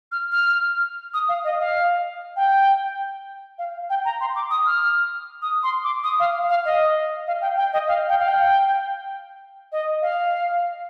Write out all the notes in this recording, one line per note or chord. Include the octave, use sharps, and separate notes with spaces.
F6
F6
D#6
F5
D#5
F5
G5
F5
G5
A#5
C6
D6
D#6
F6
D#6
C6
D6
D#6
F5
F5
D#5
F5
G5
G5
D#5
F5
G5
F5
G5
D#5
F5